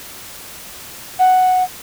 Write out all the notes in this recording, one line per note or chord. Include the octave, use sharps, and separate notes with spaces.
F#5